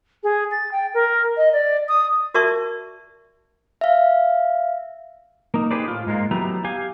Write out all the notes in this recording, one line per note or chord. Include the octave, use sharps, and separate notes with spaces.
G#4
A6
G5
A#4
D#5
D5
D#6
F#4 A#4 D5 E5 A5 C#6
E5 F5
A#3 D#4
D#4 G4 G#4 B4 C5 D5
A2 F4
G#2 G#3 A#3 F4
F#3 A3 B3 E4 G4 A#5
G4 F5 G#5